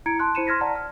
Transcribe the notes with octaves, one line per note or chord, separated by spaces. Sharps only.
E4 A#5 G#6 C#7 D7
A5 C6 F#6
E4 C5 B5 C#7 D#7 E7
C6 F6 G#6 A#6 B6
D5 F#5 A5 A#5
F6